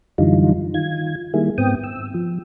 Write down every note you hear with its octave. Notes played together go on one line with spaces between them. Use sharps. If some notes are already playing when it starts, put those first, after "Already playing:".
F#2 D3 E3 G3 D#4 F4
D#3 F4 G#6
D#3 G3 A#3 E4 G#4
G#2 B3 C4 G5 D#6
E6
F3